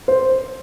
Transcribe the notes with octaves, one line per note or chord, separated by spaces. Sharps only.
C5